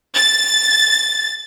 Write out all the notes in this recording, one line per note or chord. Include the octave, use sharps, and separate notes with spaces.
A6